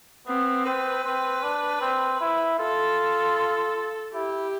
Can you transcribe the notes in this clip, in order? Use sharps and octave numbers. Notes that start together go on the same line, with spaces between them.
B3 C4
C4 B4
C4
D4
C4
E4
F4 A4
E4 G4